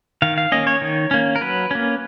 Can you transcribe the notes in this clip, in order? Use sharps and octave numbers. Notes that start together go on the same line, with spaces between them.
D#3 F5
F5
A#3 C#4 D#5
C#5
D#3
A#3 C#4
A#4
F#3 B4
A#3 C#4